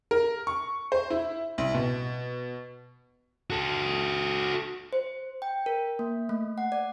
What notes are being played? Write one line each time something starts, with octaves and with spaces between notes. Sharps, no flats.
A#4
C#6
C5
E4
C2
B2
F#4 A4
C5
G5
A#4
A#3
A3
F#5
D5